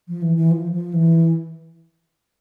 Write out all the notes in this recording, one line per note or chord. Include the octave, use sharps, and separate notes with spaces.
F3
E3
E3
F3
F3
E3